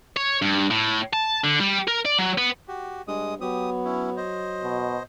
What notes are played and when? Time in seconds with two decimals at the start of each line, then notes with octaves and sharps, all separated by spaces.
0.17 C#5
0.42 G2
0.71 A2
1.13 A5
1.44 D3
1.60 G3
1.88 A#4
2.05 D5
2.18 F#3
2.38 B3
2.68 F#4 G4
3.08 G2 G#3 D#6
3.41 F#3 B3 G4 D#6
3.85 C#4 E4
4.17 C5 D#5
4.62 B2